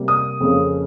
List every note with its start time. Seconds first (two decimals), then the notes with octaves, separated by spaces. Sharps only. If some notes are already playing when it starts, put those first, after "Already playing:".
Already playing: C3 G3 A#3
0.08 D#6
0.40 F2 C#3 F3 A#3 C#4